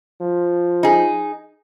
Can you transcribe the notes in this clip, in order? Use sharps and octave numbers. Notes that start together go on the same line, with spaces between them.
F3
D#4 G#4